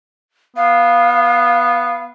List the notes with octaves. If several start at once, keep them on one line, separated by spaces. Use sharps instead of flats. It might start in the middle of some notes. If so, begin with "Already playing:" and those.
B3 F5